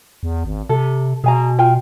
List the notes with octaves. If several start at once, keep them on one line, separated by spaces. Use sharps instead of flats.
E2
G#1
C3 A4
B2 G#4 G#5 A#5
F4 G5 G#5